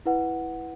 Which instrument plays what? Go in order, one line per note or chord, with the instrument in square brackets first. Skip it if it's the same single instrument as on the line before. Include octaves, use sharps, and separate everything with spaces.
[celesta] E4 B4 F#5